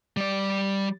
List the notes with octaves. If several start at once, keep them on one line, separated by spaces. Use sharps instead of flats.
G3 D5